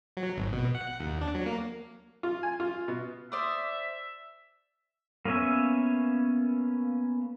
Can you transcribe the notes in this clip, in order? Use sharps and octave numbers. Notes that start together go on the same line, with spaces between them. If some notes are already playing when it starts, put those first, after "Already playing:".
F#3
G#1
B2
F#5
D#2
D4
F#3
A#3
F4
G#5
F4
B2
C5 D5 E5 D#6
A#3 B3 C#4 C#5 E5